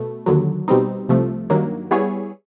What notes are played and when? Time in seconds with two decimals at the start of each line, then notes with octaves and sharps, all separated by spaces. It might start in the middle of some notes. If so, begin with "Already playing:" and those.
Already playing: B2 A3
0.26 D#2 D3 F#3
0.68 B2 G3 C4 D#4
1.09 C2 C3 F3 A3
1.50 G2 D#3 F#3 A#3
1.91 G3 B3 E4 G#4 C#5